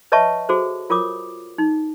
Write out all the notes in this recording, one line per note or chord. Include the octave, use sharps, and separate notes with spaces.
B4 C#5 D#5 E5 A5 C#6
F#4 G#4 A4 C5
F4 A#4 C#5 D6 D#6
D#4